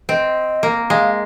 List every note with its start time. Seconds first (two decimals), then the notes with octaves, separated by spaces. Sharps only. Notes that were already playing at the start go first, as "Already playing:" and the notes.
0.09 C4 D#5
0.63 A#3
0.90 G#3 F5